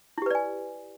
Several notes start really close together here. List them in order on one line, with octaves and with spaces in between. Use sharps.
E4 G4 B4 D5 G#5